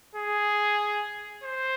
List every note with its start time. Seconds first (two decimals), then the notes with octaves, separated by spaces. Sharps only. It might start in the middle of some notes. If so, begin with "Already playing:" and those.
0.15 G#4
1.44 C5